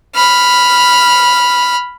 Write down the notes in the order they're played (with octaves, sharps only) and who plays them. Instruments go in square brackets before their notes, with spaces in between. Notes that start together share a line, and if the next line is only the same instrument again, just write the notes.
[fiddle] B5 F6